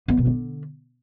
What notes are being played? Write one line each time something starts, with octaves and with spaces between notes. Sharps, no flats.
B3
B2
D3